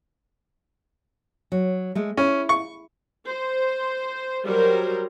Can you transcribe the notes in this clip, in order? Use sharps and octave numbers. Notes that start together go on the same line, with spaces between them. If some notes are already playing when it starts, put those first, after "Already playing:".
F#3
G#3 A3
C#4 E4
C#6
C5
F#3 G3 A#4 C5